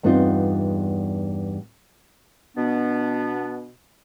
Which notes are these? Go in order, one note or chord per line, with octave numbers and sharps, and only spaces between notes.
E2 G2 B3 C4 D#4 F4
B2 B3 D4